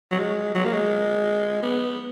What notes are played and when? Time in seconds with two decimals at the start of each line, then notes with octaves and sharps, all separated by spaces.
0.11 F#3
0.19 G#3
0.55 F#3
0.65 A#3
0.73 G#3
1.63 B3